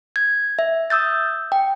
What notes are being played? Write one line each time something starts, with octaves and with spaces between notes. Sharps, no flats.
G#6
E5
D#6 E6 G6 A6
G5